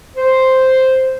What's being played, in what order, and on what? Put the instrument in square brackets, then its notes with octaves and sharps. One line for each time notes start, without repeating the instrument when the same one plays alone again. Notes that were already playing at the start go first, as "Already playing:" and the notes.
[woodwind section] C5